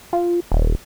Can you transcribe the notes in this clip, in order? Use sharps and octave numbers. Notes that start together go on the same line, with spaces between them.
F4
D#1